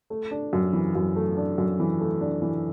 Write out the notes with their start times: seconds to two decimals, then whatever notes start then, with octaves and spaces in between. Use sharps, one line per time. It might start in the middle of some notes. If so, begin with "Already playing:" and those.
0.10 A3
0.31 D4
0.53 F#2
0.73 E3
0.95 F#2
1.16 A3
1.37 D4
1.58 F#2
1.80 E3
2.00 A3
2.21 D4
2.42 E3